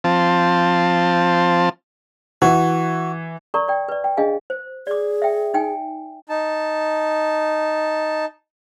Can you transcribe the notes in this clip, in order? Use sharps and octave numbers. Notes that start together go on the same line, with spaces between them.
F3 C4 A5
E3 F#4
A#4 D5 A#5 C#6
D5 G5
B4 D5
G5
D4 G#4 D#5 F5 G#5
C5
G#4 D5 D6
E5 G5
D#4 G5 G#5
D#4 A5